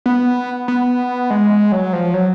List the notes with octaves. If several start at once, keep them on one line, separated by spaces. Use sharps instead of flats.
B3
B3
G#3
F#3
F3
F#3